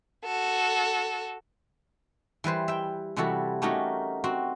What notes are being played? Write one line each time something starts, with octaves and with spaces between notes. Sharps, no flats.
F#4 A4
E3 G3 B4 C5
E5 G5
C3 E3 G3 E4 F#4 A4
A3 C#4 D#4 F#4 G4 A#4
C4 F#4